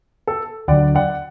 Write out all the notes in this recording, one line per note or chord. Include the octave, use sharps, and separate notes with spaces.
A4
D2 D3 F#3 D5 F#5
D5 F#5